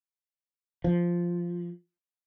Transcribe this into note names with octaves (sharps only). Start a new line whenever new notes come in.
F3